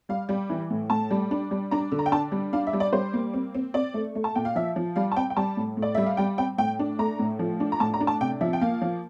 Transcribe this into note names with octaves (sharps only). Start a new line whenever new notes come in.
G3 F5
G3
E3
A2
A2 A5
G3
D4
G3
D4 A#5
D3
A#5
G5
D4 A5
G3
D4 F5
E5
G3
D5
G3 C5
A#3
C4
C4
C4 D5
A3
A3
A5
A#2 G5
F5
F3 E5
F3
G3 F5
A5
C4 G5
G5
G3 A5
A2
A2
D5
G3 E5
F5
G3 G5
C4 G5
A2 G5
D4
A3 A#5
A2
F3
D4
A#5
A2 A5
A#5
D4
A5
C3 G5
F3 E5
G5
A#3 F5
F3